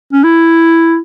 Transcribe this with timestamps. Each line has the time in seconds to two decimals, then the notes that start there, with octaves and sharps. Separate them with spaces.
0.13 C#4
0.23 E4